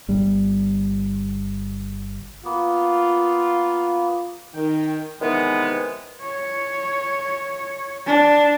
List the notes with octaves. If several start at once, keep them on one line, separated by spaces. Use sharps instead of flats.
G1 G3
A#3 B3 F4
D#3 G5
C3 D#3 E3 G#3 B3
C#5
D4